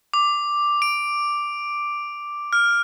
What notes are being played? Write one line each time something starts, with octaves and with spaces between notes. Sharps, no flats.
D6
D7
F6